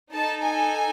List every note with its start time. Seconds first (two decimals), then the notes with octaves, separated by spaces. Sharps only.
0.14 D#4 A4 A5
0.43 G#5